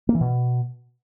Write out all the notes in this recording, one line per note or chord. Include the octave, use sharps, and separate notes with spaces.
A#3
E3
B2